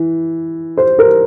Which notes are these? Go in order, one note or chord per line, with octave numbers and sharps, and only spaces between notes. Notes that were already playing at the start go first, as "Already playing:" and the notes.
Already playing: E3
C5
A#4